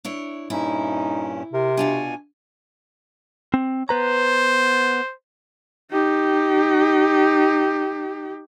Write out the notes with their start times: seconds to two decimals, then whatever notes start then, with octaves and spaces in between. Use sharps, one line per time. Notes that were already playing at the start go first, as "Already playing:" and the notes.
0.05 D4 E4 C#5
0.50 G2 A#2 C#4 D#4 E4
1.53 C3 A#4
1.77 B2 D4 F4 F#4 G#5
3.54 C4
3.89 B3 B4 C5 A#5
5.91 D#4 G4